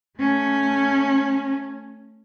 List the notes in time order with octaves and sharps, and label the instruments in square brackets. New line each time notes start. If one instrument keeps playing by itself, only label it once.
[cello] A3 C#4